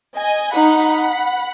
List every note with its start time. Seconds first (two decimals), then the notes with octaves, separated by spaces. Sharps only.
0.15 D#5 G#5
0.54 D#4 F#5 B5